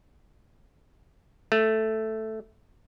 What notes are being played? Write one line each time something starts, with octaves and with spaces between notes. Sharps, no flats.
A3